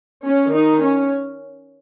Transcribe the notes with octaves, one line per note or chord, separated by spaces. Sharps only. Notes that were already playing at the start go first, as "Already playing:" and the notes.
C#4
D#3 D#4
C#4